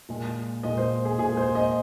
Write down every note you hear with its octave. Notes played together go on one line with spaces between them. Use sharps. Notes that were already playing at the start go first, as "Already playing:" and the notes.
A#2 G#3
A#2 G#3 D#5
C5
G#4
A#2 G#3 G#4
C5
D#5